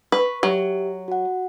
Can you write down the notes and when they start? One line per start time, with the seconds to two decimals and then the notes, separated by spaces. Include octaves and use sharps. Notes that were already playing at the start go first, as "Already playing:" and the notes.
0.12 B4 C#6
0.43 F#3 G4 E5
1.08 F#4 F#5